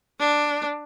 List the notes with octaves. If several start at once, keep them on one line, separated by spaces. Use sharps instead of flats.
D4